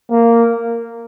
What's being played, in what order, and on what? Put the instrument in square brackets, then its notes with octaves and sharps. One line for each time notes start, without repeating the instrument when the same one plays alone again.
[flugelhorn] A#3